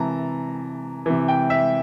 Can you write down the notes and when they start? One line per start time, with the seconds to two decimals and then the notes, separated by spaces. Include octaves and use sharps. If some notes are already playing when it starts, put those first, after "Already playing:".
Already playing: C3 E3 A5 A#5
1.06 C3 E3
1.28 G5
1.50 E5